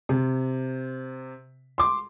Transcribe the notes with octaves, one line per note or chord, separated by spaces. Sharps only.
C3
C6 D6